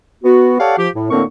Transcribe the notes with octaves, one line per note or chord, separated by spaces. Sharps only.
B3 F#4
G4 A4 C#5 D5 F5 F#5
F3 G4
A2
A2 D3 A#3 C4 A#4 C#6